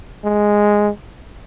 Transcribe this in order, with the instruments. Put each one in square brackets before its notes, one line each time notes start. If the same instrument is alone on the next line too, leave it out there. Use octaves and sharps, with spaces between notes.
[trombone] G#3